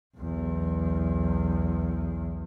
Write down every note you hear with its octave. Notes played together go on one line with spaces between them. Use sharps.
B1 E2